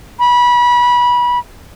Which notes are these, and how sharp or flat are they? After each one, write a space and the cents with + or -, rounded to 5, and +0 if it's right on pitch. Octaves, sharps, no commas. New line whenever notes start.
B5 -25